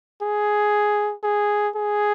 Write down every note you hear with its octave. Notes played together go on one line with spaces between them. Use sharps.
G#4
G#4
G#4